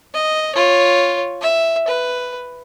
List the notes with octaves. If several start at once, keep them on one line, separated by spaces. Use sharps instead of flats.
D#5
F4 C#5
E5
B4